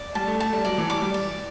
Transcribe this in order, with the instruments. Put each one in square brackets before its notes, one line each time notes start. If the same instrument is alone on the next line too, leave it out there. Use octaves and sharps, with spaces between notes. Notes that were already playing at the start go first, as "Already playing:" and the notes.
Already playing: [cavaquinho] D5
[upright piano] G3 [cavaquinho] A5
[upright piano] A3
[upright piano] A3 [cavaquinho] A5
[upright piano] G3
[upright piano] F#3 [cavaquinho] D5
[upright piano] E3
[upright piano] G3 [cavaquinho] D6
[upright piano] G3
[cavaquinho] D5